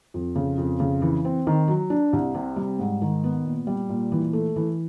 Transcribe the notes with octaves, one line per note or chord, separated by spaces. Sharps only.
F2
C#3
F2
C#3
E3
C4
D#3
F#3
D4
C2
C3
G3
G#2
D#3
B3
A#2
G3
A#2
E3
A3
E3